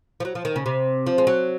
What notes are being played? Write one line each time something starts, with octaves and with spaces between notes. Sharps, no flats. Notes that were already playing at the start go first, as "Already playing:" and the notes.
F3
F#3
F3
D#3
C#3
C3
F3
G#3
F#3